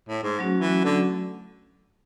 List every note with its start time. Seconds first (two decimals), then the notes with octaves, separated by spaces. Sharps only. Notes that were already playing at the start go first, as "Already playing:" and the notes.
0.09 A2
0.23 G#2
0.39 F#3 A3 C#4 F#4
0.61 E3
0.84 D3